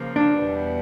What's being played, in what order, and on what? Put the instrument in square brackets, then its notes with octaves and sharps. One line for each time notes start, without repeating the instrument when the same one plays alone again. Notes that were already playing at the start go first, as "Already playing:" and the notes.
Already playing: [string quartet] C#3 F3 A#3
[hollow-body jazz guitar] D4
[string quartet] E2 B2 G3 B3 E4